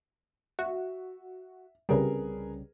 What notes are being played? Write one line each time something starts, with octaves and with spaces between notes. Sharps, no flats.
F#4 E5
C2 C#3 G3 G#4 A#4 B4